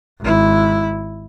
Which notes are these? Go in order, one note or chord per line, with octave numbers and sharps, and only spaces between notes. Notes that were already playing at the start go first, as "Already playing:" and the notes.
G#1 E4